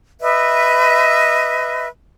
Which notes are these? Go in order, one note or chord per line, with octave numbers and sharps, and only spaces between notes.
B4 D#5 E5